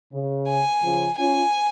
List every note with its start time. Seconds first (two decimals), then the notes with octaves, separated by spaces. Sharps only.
0.12 C#3
0.48 G#5
0.83 C#3 F3
1.18 C#4 F4 G#5